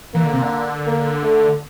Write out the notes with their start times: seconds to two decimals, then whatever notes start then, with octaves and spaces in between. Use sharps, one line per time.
0.14 E3 A#3
0.24 D3
0.33 C3
0.42 D3
0.87 A#3
1.23 A3